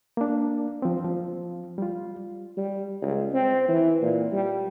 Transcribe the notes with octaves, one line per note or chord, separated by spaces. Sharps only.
A#3 D4
F3 C4
F3
G3 F4
G3
C#2
C4
E3
A#2
G3